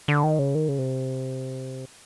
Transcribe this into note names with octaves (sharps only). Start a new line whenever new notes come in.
D3
D#3
C#3
D#3
C#3
C3